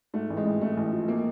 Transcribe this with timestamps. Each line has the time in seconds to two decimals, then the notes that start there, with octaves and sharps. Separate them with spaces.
0.14 G#2 A3
0.30 A1
0.37 G#3
0.45 A1
0.61 A1 A3
0.77 A1
0.92 F3
1.08 A#3